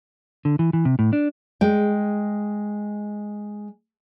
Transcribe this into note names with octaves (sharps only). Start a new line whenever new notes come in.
D3
E3
E3
C3
A2
D4
G#3 G5